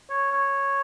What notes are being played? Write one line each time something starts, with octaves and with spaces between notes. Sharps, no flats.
C#5
C#5